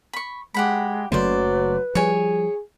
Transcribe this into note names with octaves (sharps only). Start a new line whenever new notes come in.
B5 C#6
G#3 G4 F#5 B5
F#1 C#3 F#3 A3 B4 C5 D5
F3 G3 G#4 C#5 G#5